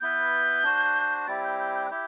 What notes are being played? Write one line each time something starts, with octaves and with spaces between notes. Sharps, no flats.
B3 E4 B4 G6
D4 F#4 C5
G3 C4 E4 G4 A6
G6
G6
G6
F#6
E4 G4 G6